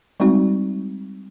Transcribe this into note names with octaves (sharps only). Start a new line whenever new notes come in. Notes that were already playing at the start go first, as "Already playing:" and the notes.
G3 G#3 C4 D#4 F#4